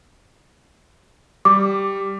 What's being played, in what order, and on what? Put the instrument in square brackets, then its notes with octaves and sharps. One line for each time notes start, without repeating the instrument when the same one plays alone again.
[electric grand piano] G3 [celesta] D6